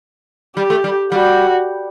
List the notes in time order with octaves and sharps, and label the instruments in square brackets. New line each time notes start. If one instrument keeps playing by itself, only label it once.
[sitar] G3 [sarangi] G4
[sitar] A3
G3
[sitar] G3 [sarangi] F#4